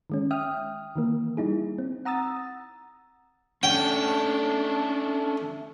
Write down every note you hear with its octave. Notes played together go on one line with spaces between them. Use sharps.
D#3 G#3 C#4
E5 G5 D#6 F6
D#3 E3 A#3
G3 D#4 E4 G#4
C4
F#5 A#5 D#6 E6 A6
A3 C#4 D4 G5